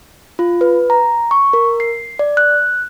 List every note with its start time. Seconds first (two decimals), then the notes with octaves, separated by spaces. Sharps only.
0.39 F4
0.61 B4
0.90 A#5
1.31 C#6
1.53 A#4
1.80 C7
2.19 D5
2.37 F#6